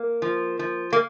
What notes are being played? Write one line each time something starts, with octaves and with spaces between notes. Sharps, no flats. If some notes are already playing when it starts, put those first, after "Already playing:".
Already playing: A#3
F3
F3
A#3